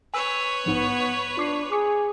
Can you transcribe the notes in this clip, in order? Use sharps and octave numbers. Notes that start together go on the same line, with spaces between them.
B4 C#5 G#5 E6
A#1 G#2 B3 D#7
D4 F4 D6 C7
G#4 D6 C#7